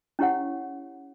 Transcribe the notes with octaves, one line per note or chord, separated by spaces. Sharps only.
C#4 E4 G4 C#5 F#5